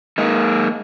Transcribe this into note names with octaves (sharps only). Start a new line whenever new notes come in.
G#3 A#3 D#4